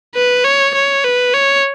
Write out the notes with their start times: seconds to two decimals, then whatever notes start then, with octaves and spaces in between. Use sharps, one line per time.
0.15 B4
0.45 C#5
0.75 C#5
1.04 B4
1.34 C#5